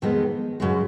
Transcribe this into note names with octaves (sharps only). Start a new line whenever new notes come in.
F2 D#3 G#3 B3
F#2 C#3 G#3